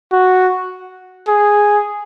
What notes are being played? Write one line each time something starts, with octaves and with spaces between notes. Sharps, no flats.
F#4
G#4